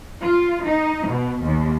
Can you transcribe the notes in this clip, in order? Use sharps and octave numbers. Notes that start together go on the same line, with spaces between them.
F4
D#4
B2
D#2